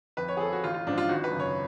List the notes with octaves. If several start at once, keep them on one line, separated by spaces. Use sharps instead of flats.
F2 B4
C#5
G#4
F3 A4
F#4
A1 F4
F4
G#2 F3 D4
F4
G#1 F#4
B4
F#2 C#3
C#5